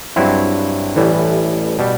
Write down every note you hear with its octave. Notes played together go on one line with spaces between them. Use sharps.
G2 F#3 C4 E4
A1 A2 E3 G3
B2 G3